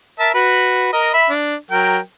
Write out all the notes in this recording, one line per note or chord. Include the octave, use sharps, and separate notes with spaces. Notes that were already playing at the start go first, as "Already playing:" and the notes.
A#4 E5 A5
F#4 B4
A#4 D#5
E5 B5
D4
F#3 A#4 G5